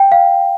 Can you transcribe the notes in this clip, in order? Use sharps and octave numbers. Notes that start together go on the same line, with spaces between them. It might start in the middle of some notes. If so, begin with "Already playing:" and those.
Already playing: G5
F5